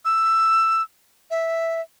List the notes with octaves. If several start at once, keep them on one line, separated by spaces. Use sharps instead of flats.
E6
E5